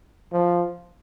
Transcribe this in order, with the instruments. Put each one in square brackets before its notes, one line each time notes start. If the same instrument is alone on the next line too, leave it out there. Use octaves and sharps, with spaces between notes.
[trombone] F3